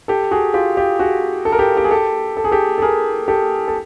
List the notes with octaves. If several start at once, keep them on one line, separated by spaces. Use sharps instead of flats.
G4 A4
F#4 G#4
F4 G4
F4 G4
F#4 G#4
A4
A#4
G4 A4
G4
G#4
G4 A4
A4
G#4
G4 A4
A4
G#4 A#4
G4 A4
A4